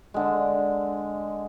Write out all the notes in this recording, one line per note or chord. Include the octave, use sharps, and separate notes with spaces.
D3 G#3